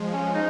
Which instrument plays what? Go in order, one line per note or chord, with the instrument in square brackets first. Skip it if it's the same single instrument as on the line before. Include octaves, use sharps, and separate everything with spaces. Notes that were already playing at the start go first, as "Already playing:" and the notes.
Already playing: [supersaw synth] F3 G#3
[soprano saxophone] C#4
D#4